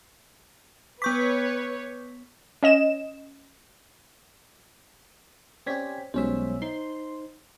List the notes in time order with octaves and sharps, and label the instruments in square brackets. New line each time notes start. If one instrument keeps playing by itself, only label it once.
[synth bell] B3 C#6 B6 [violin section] B4 C#5 [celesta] D6 G6
[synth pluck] C#4 D#5 E7
[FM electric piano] C4 C#4 G4 [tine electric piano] D5 G#6 B6
[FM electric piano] B1 C#4 E5 [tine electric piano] G3 G#3 C5
[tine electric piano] D#4 C5 [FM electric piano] C6